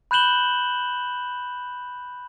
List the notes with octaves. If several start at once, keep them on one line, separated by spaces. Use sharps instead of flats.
B5 F#6 G6 E7 F#7 G7